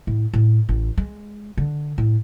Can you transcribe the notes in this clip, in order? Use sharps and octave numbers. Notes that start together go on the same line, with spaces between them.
A2
A2
A1
G#3
D3
A2